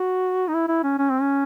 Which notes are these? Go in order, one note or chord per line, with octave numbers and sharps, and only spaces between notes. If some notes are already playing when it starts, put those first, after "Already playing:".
Already playing: F#4
D#4
E4
E4
C#4
C#4
C4
C#4